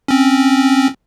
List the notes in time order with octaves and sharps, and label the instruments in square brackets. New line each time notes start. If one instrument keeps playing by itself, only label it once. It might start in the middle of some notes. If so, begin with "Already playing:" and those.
[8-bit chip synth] C4 C#4